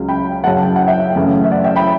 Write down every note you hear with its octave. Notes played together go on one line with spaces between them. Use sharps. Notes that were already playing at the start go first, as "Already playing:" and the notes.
Already playing: C#2 C#3 F#3
G5 B5
F#2 C#3 F#3 F#5 A5
G5
F#5
E5 G5
F#2 C#3 E3 A3
E5
D5 F#5
E5 G5
G5 B5